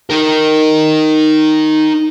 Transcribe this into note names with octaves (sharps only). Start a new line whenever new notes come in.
D#4 A#4